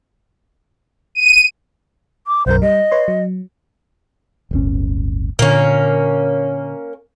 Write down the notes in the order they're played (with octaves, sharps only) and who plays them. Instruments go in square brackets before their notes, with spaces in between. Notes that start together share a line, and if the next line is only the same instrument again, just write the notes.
[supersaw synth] D#7
[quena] D6
[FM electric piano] B1 F#2 A#4 [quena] C5
[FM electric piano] G3 [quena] D#5
[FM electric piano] B4 C#5 C6
F#3
[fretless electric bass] D1 G1 C#4
[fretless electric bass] A#2 D3 [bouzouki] A#3 C#4